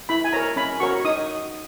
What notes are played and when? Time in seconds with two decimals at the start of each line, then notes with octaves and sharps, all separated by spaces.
0.09 E4 B5
0.24 G#5
0.33 A#4 C#5 A#5
0.56 C#4 B5
0.80 F#4 A#4 C#5 C#6
1.05 D#4 D#6